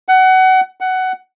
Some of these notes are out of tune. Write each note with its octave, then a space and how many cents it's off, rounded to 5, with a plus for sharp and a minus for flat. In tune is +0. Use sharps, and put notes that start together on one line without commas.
F#5 +25
F#5 +15